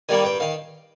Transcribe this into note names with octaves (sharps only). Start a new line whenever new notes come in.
D#3 G3 A#3 G#5
G2 G5
D#3 F5